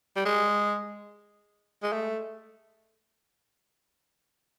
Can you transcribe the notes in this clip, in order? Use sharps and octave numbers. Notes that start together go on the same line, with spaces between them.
G3
G#3
G#3
A3